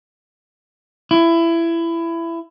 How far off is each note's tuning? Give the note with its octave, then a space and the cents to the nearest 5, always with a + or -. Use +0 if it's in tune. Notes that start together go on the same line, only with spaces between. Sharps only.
E4 +20